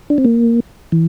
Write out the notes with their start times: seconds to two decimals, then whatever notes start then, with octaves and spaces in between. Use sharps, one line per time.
0.10 D4
0.18 C4
0.25 A#3
0.92 E3